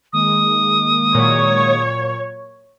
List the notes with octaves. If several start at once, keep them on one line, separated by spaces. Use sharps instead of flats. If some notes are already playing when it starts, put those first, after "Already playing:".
D#3 G#3 A#3 D#6
A#2 F#3 C#5